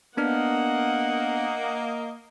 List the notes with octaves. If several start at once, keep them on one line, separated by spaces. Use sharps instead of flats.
A#3 B3 D4 D#5 F#5 F6